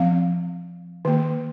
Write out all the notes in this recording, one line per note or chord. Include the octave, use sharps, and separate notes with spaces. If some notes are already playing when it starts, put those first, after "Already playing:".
Already playing: F3 C4 F5
D#3 A#3